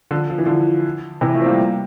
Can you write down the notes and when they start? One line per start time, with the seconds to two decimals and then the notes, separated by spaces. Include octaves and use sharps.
0.11 D3 F3
0.30 F3
0.38 E3
0.45 D3 F3
1.21 C3 E3
1.34 F3 A3
1.42 C4
1.46 G3 A#3